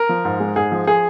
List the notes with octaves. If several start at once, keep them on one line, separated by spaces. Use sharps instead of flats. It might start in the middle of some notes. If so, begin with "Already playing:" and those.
Already playing: A#4
F3
G#2
G#3
G#2 G#4
F3
G#4